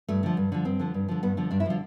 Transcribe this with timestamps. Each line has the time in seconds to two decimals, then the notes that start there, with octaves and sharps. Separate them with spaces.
0.08 G2 A3
0.23 D3 F3
0.37 G2
0.52 D3 F3
0.65 G2 C4
0.79 D3 F3
0.94 G2
1.08 D3 F3
1.23 G2 B3
1.37 D3 F3
1.51 G2 D4
1.60 E4
1.66 D3 F3 F4